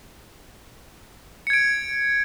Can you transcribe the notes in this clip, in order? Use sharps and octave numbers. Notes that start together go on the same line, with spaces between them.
G#6 C#7 D7